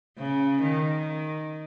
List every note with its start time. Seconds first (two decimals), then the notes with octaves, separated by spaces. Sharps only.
0.18 C#3
0.62 D#3